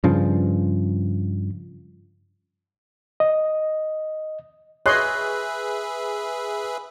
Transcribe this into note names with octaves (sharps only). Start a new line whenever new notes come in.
G2 C#3 F3
D#5
G#4 B4 C#5 D#5 E5 C6 F#6